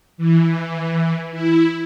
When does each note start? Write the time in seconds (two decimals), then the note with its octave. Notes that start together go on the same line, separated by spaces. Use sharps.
0.18 E3
1.32 E4